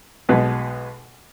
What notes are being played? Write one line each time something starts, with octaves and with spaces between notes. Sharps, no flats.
B1 B2 G#3 B3